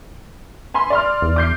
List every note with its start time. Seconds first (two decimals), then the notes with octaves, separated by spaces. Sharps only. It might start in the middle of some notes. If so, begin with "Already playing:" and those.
0.74 G#5 B5 C6
0.90 D5 C6 F6
1.22 E2
1.36 D6 G6 C7